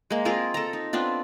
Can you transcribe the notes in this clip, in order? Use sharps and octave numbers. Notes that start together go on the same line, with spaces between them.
G#3 A#3
C4 F4 G#4 A#4
A4 A#5
D#4
B3 C4 D4 F4